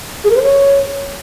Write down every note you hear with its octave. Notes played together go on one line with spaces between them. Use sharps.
G#4
A#4
C5
C#5